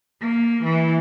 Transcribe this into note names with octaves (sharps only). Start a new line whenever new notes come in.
A#3
E3